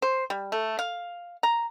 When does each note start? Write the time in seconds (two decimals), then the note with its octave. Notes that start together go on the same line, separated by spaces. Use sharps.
0.02 C5
0.30 G3
0.52 A3
0.79 F5
1.43 A#5